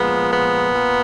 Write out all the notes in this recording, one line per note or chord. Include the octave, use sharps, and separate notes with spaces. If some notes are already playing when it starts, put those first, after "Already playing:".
Already playing: A#2 F3 G#3 B3
B3
A#2